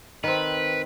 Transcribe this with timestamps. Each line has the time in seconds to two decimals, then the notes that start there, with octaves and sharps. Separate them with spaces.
0.24 D#3 C4 B4